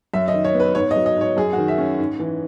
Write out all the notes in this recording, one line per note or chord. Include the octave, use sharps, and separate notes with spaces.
F#2 E5
D#5
D#3
C#5
B3
B4
G#2 C#5
D#5
F#3
D#5
G#2 C#5
F#2 G#4
F#4
D#3
E5
C#4
G#2
E3